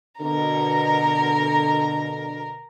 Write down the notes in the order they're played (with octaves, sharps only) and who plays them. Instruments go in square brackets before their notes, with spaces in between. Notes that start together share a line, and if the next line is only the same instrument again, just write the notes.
[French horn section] B2 D3 [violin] A#4 A#5